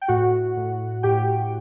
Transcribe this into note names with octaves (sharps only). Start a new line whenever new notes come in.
G5
A2 F#4 F#5
A2
A2 G4 G5